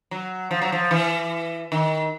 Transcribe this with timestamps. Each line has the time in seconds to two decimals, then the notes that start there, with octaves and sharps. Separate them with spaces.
0.11 F#3
0.51 F3
0.62 F#3
0.72 F3
0.91 E3
1.72 D#3